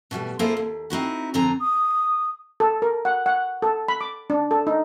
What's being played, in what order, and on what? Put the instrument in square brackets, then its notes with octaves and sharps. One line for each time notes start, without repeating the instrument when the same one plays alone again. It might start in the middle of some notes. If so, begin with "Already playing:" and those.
[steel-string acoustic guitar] B2 E3 G3 A3
A#3 E4 F4 G#4 A4 C5
D#2
C4 D#4 E4 F#4
F2 D3 C4 G#5 A#5
[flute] D#6
[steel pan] A4
A#4
F#5
F#5
A4
B5
D6
D4
A4
D#4